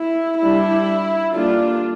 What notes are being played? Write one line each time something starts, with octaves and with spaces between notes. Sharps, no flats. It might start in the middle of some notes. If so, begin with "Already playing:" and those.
Already playing: E4
G3 D4 E4
D3 G3 A#3 D4 F4